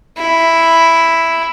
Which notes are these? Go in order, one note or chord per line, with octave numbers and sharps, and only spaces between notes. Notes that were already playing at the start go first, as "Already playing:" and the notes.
E4